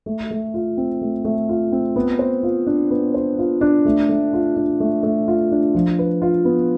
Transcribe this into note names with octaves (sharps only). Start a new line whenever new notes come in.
A3
A3
F4
C4
A3
A3
F4
C4
B3
C5
F4
D4
B3
C5
F4
D4
A3
A3
F4
D4
A3
A3
F4
D4
F3
B4
F4
B3